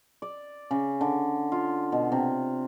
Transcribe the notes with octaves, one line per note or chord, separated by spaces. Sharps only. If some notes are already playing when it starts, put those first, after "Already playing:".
D5
C#3
D3
F4
B2
C3